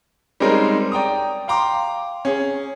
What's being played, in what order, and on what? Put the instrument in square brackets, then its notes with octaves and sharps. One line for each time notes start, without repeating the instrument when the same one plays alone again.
[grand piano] G3 G#3 C4 C#4 D#4 A#4
D5 G5 A#5 D#6
F5 G5 A#5 C6 D6
C#4 G#4